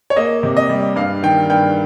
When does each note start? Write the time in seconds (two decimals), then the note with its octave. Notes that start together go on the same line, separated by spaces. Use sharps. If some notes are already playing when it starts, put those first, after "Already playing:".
0.10 C#5
0.16 A#3 D#5
0.43 C3
0.57 D#5
0.69 G3
0.96 G2 F5
1.22 D#3 G5
1.50 G2 G5